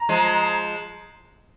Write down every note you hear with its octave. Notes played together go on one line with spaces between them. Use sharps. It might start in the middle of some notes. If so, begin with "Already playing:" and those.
Already playing: A#5
F3 G#3